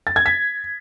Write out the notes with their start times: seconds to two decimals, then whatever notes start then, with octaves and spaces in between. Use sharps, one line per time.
0.07 A6
0.16 G#6
0.26 B6